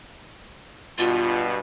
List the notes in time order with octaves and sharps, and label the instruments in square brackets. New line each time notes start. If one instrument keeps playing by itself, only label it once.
[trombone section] G2 B2 [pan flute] F4